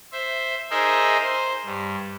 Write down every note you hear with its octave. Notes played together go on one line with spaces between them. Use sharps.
C5 E5
D#4 G#4 A#4 C5 D#5 E5
C5
G2